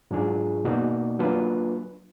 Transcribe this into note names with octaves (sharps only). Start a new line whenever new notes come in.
G#2 F#3 D4 F4 G#4
B2 A#3 D#4 F#4 D5
F#3 A#3 D4 F4 B4